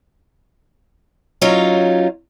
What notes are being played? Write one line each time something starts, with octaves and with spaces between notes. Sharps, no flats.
F#3 C#4 D#4 F4